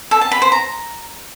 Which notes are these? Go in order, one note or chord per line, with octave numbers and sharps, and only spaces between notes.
A4
A5
B5
C5
A#5